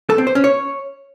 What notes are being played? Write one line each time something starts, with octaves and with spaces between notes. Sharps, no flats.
A4
C4
C5
C#4
C#5